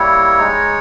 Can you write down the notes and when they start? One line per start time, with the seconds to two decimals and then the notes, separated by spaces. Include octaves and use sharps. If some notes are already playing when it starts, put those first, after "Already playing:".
Already playing: G3 A#3 E4 C#5
0.39 G#3 D#4